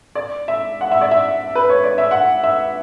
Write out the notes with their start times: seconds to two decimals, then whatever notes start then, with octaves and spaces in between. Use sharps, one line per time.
0.15 D5
0.48 E5
0.81 F#5
0.91 E5
1.01 D5
1.11 E5
1.55 B4
1.69 C#5
1.84 D5
1.98 E5
2.11 F#5
2.43 E5